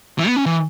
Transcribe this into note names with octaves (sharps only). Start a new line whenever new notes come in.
E3
B3
C#4
E3